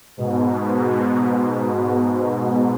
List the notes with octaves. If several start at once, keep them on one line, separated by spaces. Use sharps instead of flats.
G#2 B2